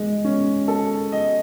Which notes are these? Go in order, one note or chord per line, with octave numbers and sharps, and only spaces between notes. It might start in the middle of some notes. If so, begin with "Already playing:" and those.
Already playing: G#3
C#4
A4
D#5